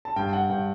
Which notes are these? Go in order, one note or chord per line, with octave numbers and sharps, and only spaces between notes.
A5
G2 G5
F#5
G2 G5